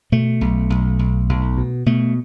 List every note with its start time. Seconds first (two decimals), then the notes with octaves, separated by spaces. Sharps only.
0.12 B2 A3
0.41 B1
0.70 B1
0.99 B1
1.29 B1
1.57 B2
1.86 B2 A3